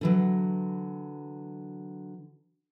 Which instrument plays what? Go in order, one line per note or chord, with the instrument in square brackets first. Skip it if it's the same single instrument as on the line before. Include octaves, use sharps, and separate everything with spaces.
[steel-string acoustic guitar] D3 E3 F#3